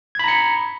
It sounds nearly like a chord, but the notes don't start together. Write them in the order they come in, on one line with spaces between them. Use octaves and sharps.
G#6 B5 A#5 C#7